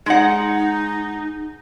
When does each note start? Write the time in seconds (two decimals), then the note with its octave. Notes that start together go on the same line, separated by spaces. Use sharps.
0.06 G#3 D#4 F#5